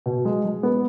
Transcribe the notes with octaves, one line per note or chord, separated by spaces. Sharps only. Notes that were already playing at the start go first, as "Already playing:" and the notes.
B2
G#3
G#3
B3